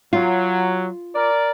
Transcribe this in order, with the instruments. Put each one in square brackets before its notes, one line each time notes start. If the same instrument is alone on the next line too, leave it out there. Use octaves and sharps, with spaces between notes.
[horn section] F#3 [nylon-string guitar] F4
[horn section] A#4 D5